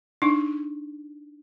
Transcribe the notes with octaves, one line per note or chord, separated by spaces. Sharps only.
D4 D#4